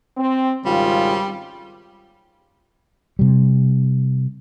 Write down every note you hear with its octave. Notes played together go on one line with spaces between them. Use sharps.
C4
G#1 C#3 G3 F4
C3 G3